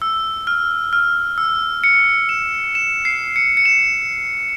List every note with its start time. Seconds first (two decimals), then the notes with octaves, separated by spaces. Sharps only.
0.02 E6
0.47 F6
0.93 F6
1.38 E6
1.84 C#7
2.29 E7
2.75 E7
3.05 C7
3.36 C#7
3.57 C#7
3.65 E7